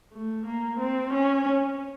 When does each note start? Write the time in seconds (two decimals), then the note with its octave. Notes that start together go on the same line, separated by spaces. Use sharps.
0.13 A3
0.46 A#3
0.80 C4
1.14 C#4